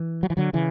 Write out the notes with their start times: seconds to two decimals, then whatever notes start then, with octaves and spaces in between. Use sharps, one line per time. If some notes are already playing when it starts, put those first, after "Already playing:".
Already playing: E3
0.23 F#3
0.30 E3
0.37 D3 F#3
0.53 C#3 E3